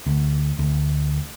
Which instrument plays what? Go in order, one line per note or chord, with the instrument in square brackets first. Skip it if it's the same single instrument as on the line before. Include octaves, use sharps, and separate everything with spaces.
[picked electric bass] D2
D2